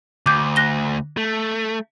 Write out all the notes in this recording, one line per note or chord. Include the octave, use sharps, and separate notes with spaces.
D2 D6 G6
F#6 A#6 G7
A3